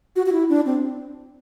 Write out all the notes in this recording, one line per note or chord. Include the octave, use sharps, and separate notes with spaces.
F#4
F#4
E4
D4
C4